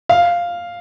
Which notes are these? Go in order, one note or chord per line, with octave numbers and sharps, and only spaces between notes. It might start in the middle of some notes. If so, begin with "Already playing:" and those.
F5